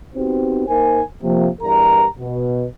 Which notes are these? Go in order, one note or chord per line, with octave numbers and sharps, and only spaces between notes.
B3 C4 D#4 F#4 G4 C5
A#3 D#4 A#4 C5 G#5
C3 F3 A#3
E2 G2 G4 A#4 A#5
B2